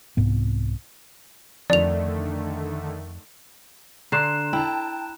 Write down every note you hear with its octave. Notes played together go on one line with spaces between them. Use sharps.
C2 G#2 B3
F2 D3 D#3 A3 D5 F7
D3 A#5 C6 F#6 C7 E7
E4 G5 A5